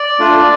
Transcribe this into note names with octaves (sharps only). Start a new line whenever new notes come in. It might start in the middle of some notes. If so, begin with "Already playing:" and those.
Already playing: D5
A3 D4 F4